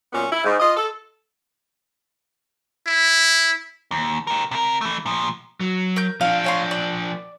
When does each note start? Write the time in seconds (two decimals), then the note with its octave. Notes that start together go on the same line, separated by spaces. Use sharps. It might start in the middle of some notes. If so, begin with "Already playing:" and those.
0.13 F#2 A#2 B3 C#4
0.31 E4
0.45 G#2
0.60 F4 D#5
0.76 A4
2.87 E4
3.91 D#2
4.27 G4 A#4
4.51 C3 A#4
4.81 E3 A3
5.06 A#2 F3
5.60 F#3
5.96 A#4 G6
6.21 F3 D4 F5
6.44 C#4 F5 C6
6.71 D5